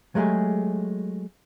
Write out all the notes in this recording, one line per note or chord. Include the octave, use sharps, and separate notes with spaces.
F#3 G#3 A3 G4 G#4